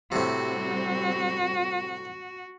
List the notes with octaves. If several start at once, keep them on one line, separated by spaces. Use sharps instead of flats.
A2 C3 G3 C4 F#4